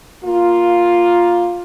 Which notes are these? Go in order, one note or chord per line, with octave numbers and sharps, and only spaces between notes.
A#3 F4